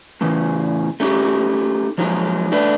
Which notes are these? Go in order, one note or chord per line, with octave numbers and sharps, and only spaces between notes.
A2 C#3 E3
A3 C#4 D#4 G4
F3 F#3 G#3 D#4
A3 D4 B4